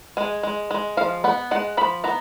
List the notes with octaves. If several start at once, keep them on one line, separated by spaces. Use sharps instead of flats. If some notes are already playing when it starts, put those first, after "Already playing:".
G#3 G#5
G#3
G#3
F3 F5
B3 F#5
G#3 F#5
F3 B5
B3 A#5